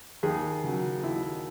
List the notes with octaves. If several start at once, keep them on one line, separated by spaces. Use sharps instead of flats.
D#2 G#4
C#3 F#3
D#2 E4